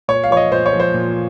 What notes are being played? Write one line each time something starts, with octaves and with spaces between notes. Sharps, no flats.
A#2 C#5
F5
F3 C#5
D#5
A#2 C5
C#5
F3
C5
A#2